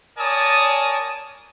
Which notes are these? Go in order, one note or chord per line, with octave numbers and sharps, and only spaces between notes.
A#4 C#5 D5 G#5 A5 D#6